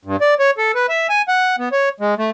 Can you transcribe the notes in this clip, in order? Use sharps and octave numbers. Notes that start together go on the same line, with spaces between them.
G2
D5
C#5
A4
B4
E5
G#5
F#5
B3
C#5
G#3
A3